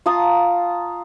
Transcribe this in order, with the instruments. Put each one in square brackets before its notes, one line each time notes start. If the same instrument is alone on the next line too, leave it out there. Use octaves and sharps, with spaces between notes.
[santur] F4 A5 A#5 D#6